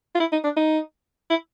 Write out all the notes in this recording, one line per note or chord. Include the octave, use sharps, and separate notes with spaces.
F4
E4
D#4
D4
D#4
E4